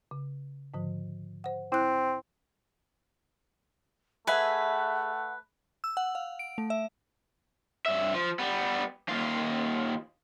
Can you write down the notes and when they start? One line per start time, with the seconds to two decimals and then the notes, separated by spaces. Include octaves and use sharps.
0.11 C#3
0.74 G#2 D3 F3
1.44 C5 F#5
1.72 C4 E4 F#6
4.27 A3 G#4 B4 E5 F#5 G#5
5.84 E6
5.97 F#5
6.15 F5
6.39 D7
6.58 A3
6.70 E5
7.86 G2 E5
8.14 F3
8.39 G3 B3
9.08 D#2 F4